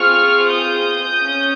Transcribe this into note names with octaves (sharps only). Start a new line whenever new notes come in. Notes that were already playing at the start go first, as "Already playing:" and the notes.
Already playing: C4 F4 G#4 C#6 F6
D#6 G6
C#4